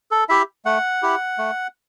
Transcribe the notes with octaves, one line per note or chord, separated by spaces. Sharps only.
A4
E4 G4 E5
A3 F#5
E4 G4
A3